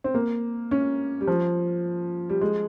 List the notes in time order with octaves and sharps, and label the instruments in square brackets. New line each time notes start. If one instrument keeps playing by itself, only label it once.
[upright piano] C4
A#3
C#4
G3
F3
G3
G#3